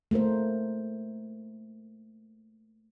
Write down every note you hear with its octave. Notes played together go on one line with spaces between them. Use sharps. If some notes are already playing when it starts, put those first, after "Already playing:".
A3 A#3 A#4 C5